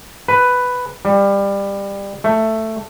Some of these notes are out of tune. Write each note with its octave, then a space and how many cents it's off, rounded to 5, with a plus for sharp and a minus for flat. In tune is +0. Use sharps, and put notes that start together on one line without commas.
B4 +5
G3 +20
A3 +5